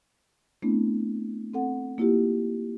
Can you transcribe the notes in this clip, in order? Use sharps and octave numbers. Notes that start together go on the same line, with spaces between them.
A3 B3 C4 D4 E4
C4 A4 F#5
A#3 E4 F4 G4